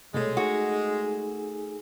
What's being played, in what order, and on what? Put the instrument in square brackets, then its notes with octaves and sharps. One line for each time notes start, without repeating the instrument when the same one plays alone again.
[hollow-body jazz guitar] C2 B2 A3 [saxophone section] G#3 [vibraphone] A4 C#5
[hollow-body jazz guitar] A3 [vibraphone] D#4 G#4 G#5 [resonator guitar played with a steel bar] F#4